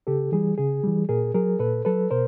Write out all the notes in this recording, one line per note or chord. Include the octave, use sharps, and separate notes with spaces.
C#3 G4 A4
E3 G3 G#4
C#3 G#4
E3 G3
A#2 G#4 A#4
F#3 G#4 A#4
A#2 A4 B4
F#3 A4 B4
B2 A#4 C5